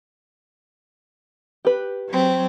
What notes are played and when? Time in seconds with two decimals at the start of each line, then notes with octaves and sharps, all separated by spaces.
1.65 G4 B4
2.09 F#3 C4